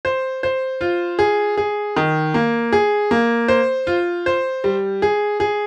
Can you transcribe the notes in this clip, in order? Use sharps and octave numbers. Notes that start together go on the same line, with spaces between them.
C5
C5
F4
G#4
G#4
D#3
A#3
G#4
A#3
C5
F4
C5
G3
G#4
G#4